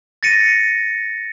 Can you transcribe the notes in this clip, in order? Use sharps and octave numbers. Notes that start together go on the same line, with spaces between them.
A6 A#6 C#7 D#7